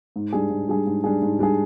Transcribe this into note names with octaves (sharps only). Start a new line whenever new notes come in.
G#2
G3 D4 G#4
G#2
G3 D4 G#4
G#2
G3 D4 G#4
G#2
G3 D4 G#4